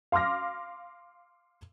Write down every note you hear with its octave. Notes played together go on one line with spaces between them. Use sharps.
F5 C6 D6 F6 A#6